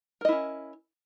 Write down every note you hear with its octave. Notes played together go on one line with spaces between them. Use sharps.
C#4 E4 A#4 D#5